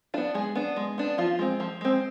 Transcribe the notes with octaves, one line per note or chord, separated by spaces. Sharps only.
B3 D4 F4
G#3 G#4
B3 D4
G#3
B3 D4
F3 F4
G#3 C4
F3
G#3 C4